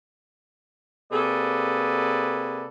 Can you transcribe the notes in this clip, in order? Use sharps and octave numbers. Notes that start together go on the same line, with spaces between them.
C3 A#3 G#4 A4 B4 D5